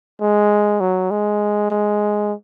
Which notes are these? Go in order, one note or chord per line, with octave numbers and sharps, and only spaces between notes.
G#3
F#3
G#3
G#3